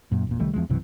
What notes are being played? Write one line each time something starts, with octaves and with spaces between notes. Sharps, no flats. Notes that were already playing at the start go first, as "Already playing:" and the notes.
F#2 A#2
E1 A#2
C2 D#3 G3 A3
E2 C3 F3 G#3
B1 F#2 C3 E3